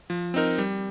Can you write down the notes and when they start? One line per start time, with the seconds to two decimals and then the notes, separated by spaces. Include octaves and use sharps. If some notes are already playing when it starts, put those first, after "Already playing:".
0.10 F3
0.34 C4 D#4 A#4
0.58 G3